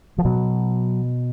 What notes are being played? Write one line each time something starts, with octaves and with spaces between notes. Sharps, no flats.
F3
B2 F#3